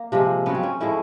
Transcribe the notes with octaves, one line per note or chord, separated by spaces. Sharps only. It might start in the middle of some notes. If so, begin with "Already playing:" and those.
Already playing: A#3
C3 F3 G#3
C#3 F#3 B3
C4
C#4
A2 F3 G#3 E4